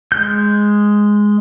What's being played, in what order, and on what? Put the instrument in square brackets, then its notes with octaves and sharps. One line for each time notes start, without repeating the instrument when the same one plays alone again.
[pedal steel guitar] G#3 G6